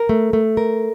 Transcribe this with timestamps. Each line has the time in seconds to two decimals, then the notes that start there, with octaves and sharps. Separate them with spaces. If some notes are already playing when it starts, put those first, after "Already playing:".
Already playing: A#4
0.09 A3
0.33 A3
0.57 A#4